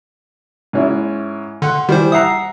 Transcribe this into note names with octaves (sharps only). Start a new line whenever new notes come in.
G#2 C#4 E4
D3 F#5 C6
D#3 E3 G3 C5
E5 F#5 A#5 D#6 C7